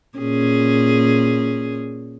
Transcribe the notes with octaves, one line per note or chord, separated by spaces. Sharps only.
A#2 C#4 G#4